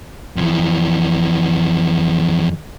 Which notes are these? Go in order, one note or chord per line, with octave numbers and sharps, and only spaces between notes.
F2 E3